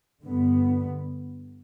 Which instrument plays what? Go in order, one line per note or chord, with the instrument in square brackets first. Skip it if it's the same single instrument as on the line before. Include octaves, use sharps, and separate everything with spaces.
[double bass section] G2 D3 B3